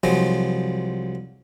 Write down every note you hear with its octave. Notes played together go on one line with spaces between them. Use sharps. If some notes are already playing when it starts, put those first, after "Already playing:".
C2 F3 F#3 G#3